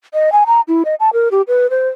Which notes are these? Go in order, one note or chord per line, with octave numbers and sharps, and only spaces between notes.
D#5
G#5
A#5
E4
D#5
A5
A#4
G4
B4
C5